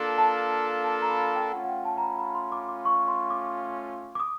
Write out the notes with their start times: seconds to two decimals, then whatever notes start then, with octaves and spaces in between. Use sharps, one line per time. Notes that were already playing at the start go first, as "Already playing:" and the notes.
Already playing: A#3 D4 F4 A4
0.18 A5
0.84 A5
1.02 A#5
1.10 B5
1.19 A#5
1.35 G5
1.52 A3 C#4 F4 F#5
1.64 F#5
1.69 G5
1.85 A5
1.98 A#5
2.02 B5
2.19 B5
2.35 C6
2.52 D6
2.69 D6
2.85 C#6
3.08 C6
3.30 D6
4.15 D6
4.20 D#6